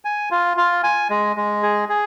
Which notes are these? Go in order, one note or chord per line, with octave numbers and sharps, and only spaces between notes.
G#5
F4
F4
G#5
G#3
G#3
G#4
G#4